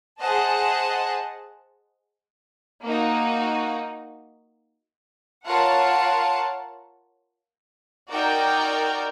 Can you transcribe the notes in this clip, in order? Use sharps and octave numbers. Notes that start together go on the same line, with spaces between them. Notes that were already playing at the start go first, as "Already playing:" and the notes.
G#4 C5 D#5 F#5 A5
A#3 D#4 F#4
F4 A#4 C#5 F#5 A5
D#4 F#4 A#4 D5 G5